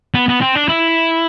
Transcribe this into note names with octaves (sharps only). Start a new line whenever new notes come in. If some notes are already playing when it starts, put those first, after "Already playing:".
B3
B3
C4
D4
E4